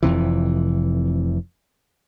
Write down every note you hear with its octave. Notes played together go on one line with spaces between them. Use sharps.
F1 F2 C3 E3